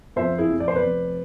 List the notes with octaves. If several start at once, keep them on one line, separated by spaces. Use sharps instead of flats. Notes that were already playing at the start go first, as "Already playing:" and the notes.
F2 C5 E5
E4 G#4
F1
D5
C5
B4 D5
F1